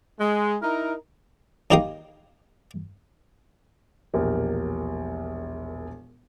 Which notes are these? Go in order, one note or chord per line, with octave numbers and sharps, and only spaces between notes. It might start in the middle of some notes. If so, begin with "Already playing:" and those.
G#3
D#4 E4 A#4
D#2 D#4 G4 A#4 F5 D#6
E1 A#1 G4 A#4